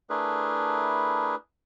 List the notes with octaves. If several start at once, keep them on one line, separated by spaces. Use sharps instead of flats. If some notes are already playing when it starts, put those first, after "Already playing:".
A3 D4 E4 G#4 A#4 B4